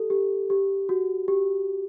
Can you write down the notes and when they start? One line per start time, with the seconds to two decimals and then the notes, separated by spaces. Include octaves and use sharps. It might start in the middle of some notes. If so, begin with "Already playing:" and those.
Already playing: G4 A4
0.10 G4
0.50 G4
0.89 F#4
1.28 G4